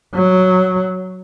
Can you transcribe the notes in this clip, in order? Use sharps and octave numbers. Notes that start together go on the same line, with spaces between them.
F#3